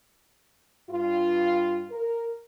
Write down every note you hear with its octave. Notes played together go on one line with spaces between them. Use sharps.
G2 F4
A#4